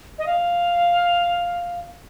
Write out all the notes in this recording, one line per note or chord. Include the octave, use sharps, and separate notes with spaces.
D#5
F5